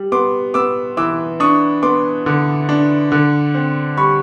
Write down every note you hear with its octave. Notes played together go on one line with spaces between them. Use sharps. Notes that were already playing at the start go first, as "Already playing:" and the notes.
Already playing: G3
B3 C6 D6
B3 D6 E6
E3 D6 E6
D4 C#6 D#6
B3 C6 D6
D3
D4
D3
C4
G3 B5 C#6